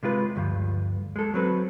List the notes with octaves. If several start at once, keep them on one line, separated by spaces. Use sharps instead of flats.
C3 G#3 F4 B4
D2 G2 F3
G#3 A4
F#3 C4 B4